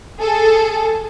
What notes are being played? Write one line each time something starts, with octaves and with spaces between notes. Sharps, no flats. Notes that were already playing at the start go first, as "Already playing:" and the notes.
G#4 A4